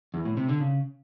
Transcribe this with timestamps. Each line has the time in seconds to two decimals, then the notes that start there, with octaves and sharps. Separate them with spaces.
0.14 E2
0.25 A2
0.37 C3
0.49 D3
0.60 C#3